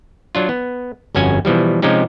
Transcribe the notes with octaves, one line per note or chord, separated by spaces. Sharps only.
F#3 D4 F4
B3
G1 F2 C#4 F#4 G#5
B2 E3 F3 G3
C3 F3 G#3 C#4 D#4 G4